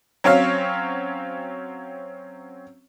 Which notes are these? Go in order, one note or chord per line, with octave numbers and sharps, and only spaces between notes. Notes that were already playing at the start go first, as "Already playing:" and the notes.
F#3 C4 C#4 C#5 F5